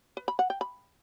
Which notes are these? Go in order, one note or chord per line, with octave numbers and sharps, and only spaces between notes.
B4
B5
F#5
G5
B5